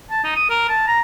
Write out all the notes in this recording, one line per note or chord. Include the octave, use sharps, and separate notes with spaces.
A5
D#4
D#6
A#4
A5
A#5